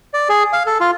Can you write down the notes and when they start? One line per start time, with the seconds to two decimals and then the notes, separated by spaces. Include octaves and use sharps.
0.14 D5
0.29 G#4
0.53 F5
0.66 A4
0.80 F4